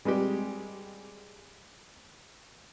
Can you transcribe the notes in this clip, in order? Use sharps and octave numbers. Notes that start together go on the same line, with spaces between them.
G3 G#3 C4 G4